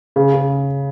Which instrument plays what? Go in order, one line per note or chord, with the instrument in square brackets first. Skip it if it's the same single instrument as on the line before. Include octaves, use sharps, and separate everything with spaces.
[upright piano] C#3
C#3